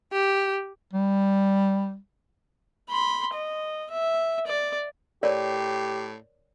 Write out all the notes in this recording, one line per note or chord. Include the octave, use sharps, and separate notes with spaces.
G4
G3
B5 C6
D#5
E5
D5
A2 G4 A#4 C#5 D5